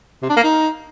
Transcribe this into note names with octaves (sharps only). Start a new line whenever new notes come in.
C3
D4
A#3
D#4